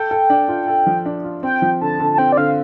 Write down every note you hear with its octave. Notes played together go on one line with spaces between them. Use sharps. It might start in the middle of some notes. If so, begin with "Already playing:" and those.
Already playing: A4 G5
A4
D4
F4
A4
F3
D4
F4
C4 G5
F3
D3 A5
D3
A5
C4 G5
D5
D3 F5